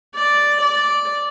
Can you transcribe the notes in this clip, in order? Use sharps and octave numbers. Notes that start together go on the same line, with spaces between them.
D5
D5